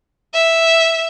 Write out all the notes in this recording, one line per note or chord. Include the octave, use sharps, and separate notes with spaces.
E5